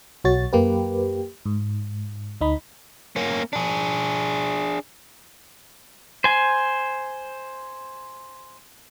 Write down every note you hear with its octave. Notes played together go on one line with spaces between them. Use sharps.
B1 F#4 C#5 A6
F#2 A#3 G4 B4
G#2
D2 D#4 B5
A#3 C#4
D4 G#4
C5 G#5